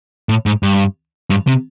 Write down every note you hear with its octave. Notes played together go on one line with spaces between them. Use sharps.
A2
G#2
G2
G2
C3